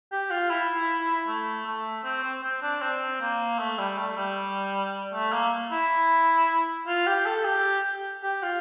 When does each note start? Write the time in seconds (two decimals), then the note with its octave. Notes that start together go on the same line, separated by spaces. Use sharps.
0.12 G4
0.30 F4
0.50 E4
1.27 A3
1.66 A3
2.04 C4
2.24 C4
2.43 C4
2.62 D4
2.81 C4
3.21 A#3
3.58 A3
3.78 G3
3.97 A3
4.16 G3
5.14 A3
5.33 A#3
5.71 E4
6.87 F4
7.07 G4
7.26 A4
7.45 G4
8.23 G4
8.42 F4